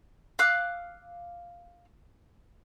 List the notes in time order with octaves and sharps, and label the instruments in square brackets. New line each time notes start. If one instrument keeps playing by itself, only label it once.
[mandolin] F5 D6 E6 F#6